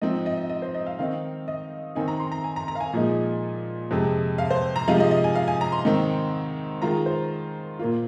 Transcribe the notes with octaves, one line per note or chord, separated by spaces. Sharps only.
G#2 F3 C4 D#4 D#5
D#5
D#5
D#5
C5
D#5
F5
D#3 C4 D#4 F5
D#5
D#3 C4 D#4 G#5
A#5
C6
A#5
G#5
A#5
A#5
F5
G#5
A#2 F3 G#3 D#4
F2 C3 G#3
F5
C5
A#5
C3 F3 G#3 D#4 F5
D#5
D#5
G#5
F5
G#5
A#5
C6
G#2 D#3 C4 D#4
D#3 G#3 F4 A#5
C5
A#2 A#3 F4